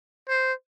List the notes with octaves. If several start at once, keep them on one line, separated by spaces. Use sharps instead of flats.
C5